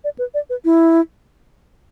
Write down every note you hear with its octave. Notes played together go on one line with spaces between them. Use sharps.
D5
B4
D5
B4
E4